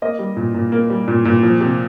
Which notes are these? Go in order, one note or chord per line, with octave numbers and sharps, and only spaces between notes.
A#3 D#5
G3
A#2
A#2
A#3
G3
A#2
A#2
F3
C3